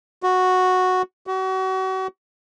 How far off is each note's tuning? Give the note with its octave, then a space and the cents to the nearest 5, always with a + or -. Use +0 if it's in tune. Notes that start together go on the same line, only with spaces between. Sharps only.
F#4 -5
F#4 +35